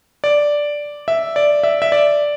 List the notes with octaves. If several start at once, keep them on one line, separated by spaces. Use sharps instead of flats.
D5
E5
D5
E5
E5
D5